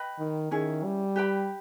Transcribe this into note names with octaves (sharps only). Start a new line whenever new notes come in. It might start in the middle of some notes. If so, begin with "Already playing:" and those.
Already playing: B4 D#5 G5 B5
D#3
D#3 C#4 E4 G#4
G3
G4 B4 G5 B5